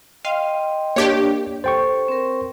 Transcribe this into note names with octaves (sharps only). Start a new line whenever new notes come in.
D#5 F5 G5 C6
A#3 D4 G4 C#5 D5
A4 C5 G5 C#6
C4 A#4